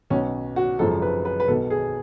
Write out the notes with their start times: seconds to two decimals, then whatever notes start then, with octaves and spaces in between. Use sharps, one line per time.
0.10 B1 B2 C#4
0.56 F#4
0.79 G#1 F#2 C#3 F3 A4
1.02 B4
1.25 B4
1.40 B4
1.48 B2 A4
1.51 B1
1.70 G#4